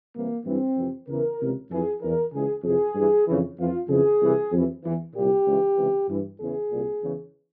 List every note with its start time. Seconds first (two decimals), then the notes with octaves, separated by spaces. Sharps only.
0.14 C2 C3 E3 A#3
0.45 G2 E3 C4
0.76 F2 C3 E3
1.08 E2 C#3 E3 A#4
1.39 C#2 C3 E3
1.70 F2 E3 G#4
2.01 E2 E3 A#4
2.33 C#2 C#3 E3 G#4
2.64 F2 C3 E3 G#4
2.95 G2 E3
3.26 F2 C#3 E3
3.58 F2 E3 F4
3.89 F2 C#3 E3 G#4
4.21 C2 C3 E3
4.52 F2 C3 E3
4.84 E2 E3
5.14 C2 A#2 G4
5.46 C#2 C#3 E3
5.76 C#2 C3 E3
6.08 G2 E3
6.39 E2 C#3 E3 G#4
6.71 C2 A#2
7.01 E2 C#3 E3